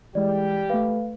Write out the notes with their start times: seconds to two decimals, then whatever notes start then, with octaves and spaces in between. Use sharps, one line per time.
0.15 E3 G3 G#3 G4 D5
0.70 A3 B4 F5